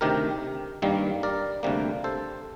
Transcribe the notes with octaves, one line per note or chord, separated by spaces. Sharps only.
D2 C3 D#3 G4 A#4
G2 D#3 G3 A#3
A#4 D5
D2 C3 G3 A#3
A4 C5